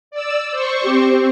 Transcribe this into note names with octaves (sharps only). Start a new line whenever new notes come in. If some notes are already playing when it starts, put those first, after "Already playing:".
D5 E6
C5 C#6
C4 G4